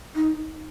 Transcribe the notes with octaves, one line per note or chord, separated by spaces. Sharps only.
D#4